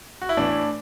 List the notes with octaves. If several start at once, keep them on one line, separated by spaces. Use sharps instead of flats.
F#4
E4
A2 E3 D4